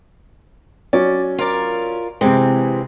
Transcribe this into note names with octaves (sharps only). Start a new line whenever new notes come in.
F#3 C#4 D5
F4 A#4 D5
C3 E3 G#3 C4